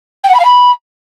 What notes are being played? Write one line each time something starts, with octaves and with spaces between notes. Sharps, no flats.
G5
F#5
B5
F5
B5